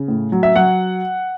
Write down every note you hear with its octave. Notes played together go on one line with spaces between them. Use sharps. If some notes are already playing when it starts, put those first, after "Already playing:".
Already playing: C#3
A2
F#3
E5
F#3 F#5